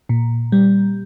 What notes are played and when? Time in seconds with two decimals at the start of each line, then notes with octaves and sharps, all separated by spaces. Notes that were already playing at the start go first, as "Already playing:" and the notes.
0.09 A#2
0.52 G3